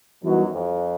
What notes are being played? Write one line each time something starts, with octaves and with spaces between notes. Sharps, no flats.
F#2 E3 G3 B3 D#4 F#4
F2